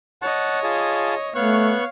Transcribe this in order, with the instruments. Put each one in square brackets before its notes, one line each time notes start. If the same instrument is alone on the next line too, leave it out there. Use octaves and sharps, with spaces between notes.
[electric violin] C#5 D#5 [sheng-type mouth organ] F#5 A5
[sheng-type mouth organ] F4 G#4 A5
[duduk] A3 [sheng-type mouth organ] B3 C#6 F#6 [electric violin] C#5 F5